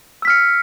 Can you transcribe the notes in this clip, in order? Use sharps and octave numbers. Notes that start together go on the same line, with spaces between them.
E6 F6 B6 C#7